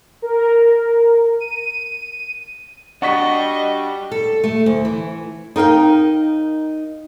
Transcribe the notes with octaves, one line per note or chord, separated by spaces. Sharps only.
A#4
D#7
G3 D4 F#4 D5 D#5 F#5 C#6 B6
A4
A3
D2
E3
D#4 A#4 F5 G5